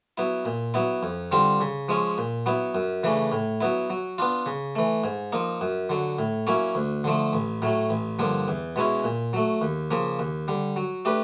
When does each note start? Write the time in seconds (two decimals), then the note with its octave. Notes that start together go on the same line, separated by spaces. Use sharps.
0.18 F#3 B3 E4
0.45 A#2
0.74 F#3 B3 E4
1.03 F2
1.32 D3 G3 C4 F4
1.60 C#3
1.89 F3 G#3 C#4
2.18 A#2
2.46 F#3 B3 E4
2.75 F#2
3.03 C#3 E3 A3 D4
3.32 A2
3.61 F#3 B3 E4
3.90 F#3
4.18 B3 D4 F4
4.46 C#3
4.75 E3 A3
5.04 G#2
5.32 F3 A#3 D#4
5.61 F#2
5.90 D3 F#3
6.19 A2
6.47 F#3 A#3 C#4 E4
6.75 D2
7.04 D3 F3 A3
7.33 A1
7.62 A2 F#3 A3
7.90 A1
8.19 G2 D3 F3 A#3
8.48 E2
8.76 B2 G#3 C#4 E4
9.04 A#2
9.33 F#3 A3
9.62 D#2
9.91 C#3 F3 A#3
10.19 D#2
10.48 D3 G3
10.76 F#3
11.05 A3 D4 G4 B4